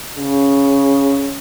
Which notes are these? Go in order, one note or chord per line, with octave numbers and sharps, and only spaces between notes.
C#3